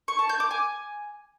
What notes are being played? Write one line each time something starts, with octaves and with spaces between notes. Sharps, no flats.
C#6
A5
G6
D6
G#5